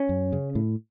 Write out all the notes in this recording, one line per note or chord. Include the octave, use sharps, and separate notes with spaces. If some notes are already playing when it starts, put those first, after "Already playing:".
Already playing: C#4
F#2
C#3
A2